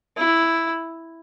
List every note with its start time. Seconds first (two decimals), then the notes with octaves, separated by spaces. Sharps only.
0.17 E4